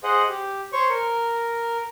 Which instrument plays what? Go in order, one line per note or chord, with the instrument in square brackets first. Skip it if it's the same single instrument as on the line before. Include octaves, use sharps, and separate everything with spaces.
[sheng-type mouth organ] G#4 C5 D#5 F#5
G4
C5 C#5 C#6
A#4